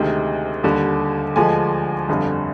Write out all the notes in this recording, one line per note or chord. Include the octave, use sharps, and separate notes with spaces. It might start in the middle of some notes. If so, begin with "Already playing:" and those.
Already playing: D2 C3 D#3 G#3
D#2 D3 G3
D2 D3 F3 G#3 G#5
G1 F2 D3 G3